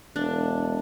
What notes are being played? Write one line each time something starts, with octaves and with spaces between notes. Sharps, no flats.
E1 D4